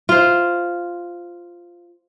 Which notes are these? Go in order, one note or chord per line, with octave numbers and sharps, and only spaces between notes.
F4 C5